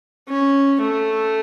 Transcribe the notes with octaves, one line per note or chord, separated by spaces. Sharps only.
C#4
A3